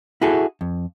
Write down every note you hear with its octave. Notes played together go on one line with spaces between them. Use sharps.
E4 F#4 G#4 A4
F2